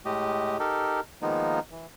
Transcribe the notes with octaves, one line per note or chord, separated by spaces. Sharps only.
A2 G#3 A3 G4 D#5
D#4 G4 A4 A#4
D#3 F3 G#3 A#3 B3 D#4
E3